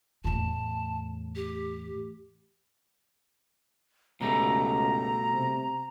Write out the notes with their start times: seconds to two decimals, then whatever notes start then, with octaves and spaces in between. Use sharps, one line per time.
0.24 E2 A2 A5
1.36 G4
4.21 C#2 B2 G3 A3 A#5
5.32 C3